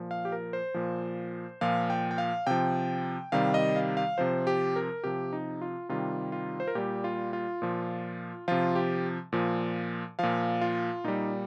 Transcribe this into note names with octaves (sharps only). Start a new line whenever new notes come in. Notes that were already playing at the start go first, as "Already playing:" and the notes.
Already playing: A#2 F3
F5
G4
A#4
C5
A#2 F3
A#2 F3 F5
G5
G5
F5
C3 F3 G5
C3 D#3 G3 F5
D#5
F5
F5
C3 F3 C5
G4
A#4
C3 F3 G4
D#4
F4
C3 D#3 G3 F4
F4
C5
A#4
A#2 G3 G4
F4
F4
A#2 F3
C3 F3 F4
G4
A#2 F3
A#2 F3 F5
F4
A#2 G3 D#4